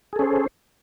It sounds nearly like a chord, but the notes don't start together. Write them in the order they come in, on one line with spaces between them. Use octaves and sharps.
G#4 A4 C#4 C5